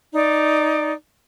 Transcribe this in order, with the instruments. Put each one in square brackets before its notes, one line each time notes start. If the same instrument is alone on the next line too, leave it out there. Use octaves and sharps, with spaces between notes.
[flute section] D#4 D5